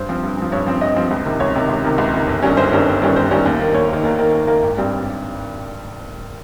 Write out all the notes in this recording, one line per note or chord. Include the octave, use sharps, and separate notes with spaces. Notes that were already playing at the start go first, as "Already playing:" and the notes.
Already playing: G2 C5
F3 C4
G2
F3 C4
G2 C#5
F3 C4
G2 D#5
F3 C4
C#2
C3 D#3
C#2 C#5
C3 D#3
C#2
C3 D#3
C#2
C3 D#3
G1
G2 D#3 G3 C#4
G1 C5
G2 D#3 G3 C#4
G1
G2 D#3 G3 C#4
G1 C5
G2 D#3 G3 C#4
D#2
D#3 A#3
D#2 C#5
D#3 A#3
D#2 A#4
D#3 A#3
D#2
D#3 A#3
G#1
G2 G3 C4